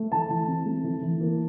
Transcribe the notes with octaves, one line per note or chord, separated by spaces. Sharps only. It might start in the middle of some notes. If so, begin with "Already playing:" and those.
Already playing: A3
E3 A5
E3
C4
A3
E3
E3
A#3